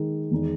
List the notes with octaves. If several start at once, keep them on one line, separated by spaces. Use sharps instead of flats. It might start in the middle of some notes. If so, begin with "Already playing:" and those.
Already playing: D#3 G#3 D#4
E2 D#3 G#3 D#4